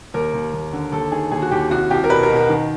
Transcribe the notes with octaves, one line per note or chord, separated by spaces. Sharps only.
D#2 A#4
D#2
D#2
D3
D#2 A4
D#3 G#4
D#2 G#4
F#4
D#2 G4
C2 F#4
C2 G4
A#4
B2 B4
A#4
B2
A#4
D#3